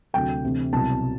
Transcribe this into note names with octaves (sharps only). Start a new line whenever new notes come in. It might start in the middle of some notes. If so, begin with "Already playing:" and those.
D2 C3 F#3 G5
D2 C3 E3
C2 B2 F#3 A5